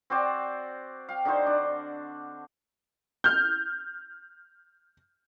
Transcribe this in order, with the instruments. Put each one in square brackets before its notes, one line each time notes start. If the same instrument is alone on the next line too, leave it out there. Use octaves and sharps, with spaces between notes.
[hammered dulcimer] C4 F#4 C5 D5
F5 G5
D3 D#4 F#4 C5
D4
[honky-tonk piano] F6 G6